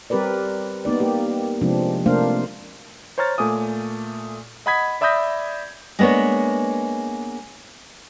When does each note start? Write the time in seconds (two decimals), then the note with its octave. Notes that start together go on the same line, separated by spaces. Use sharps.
0.10 G3 C4 G4 A#4 B4 D5
0.85 A#3 B3 D#4 D5
1.00 A#3 G4
1.61 C3 F3 G#3 C4 D4
2.06 C3 A3 A#3 D4 C5 F5
3.18 C5 C#5 A#5 F6 A6
3.38 A#2 A3 G#5 D6 D#6
4.66 D#5 F#5 B5 D#6 G#6 B6
5.01 D5 E5 B5 D#6 G6 A#6
5.99 G#3 A#3 B3 D4 C#5